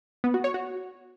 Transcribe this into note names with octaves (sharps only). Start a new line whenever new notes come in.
B3
F#4
C#5
F#4